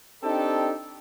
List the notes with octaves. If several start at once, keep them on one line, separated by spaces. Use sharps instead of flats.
C4 D4 D#4 G4 A4